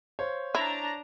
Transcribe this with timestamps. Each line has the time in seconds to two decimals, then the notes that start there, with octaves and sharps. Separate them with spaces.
0.19 C5 C#5 F5
0.55 D4 E4 A#5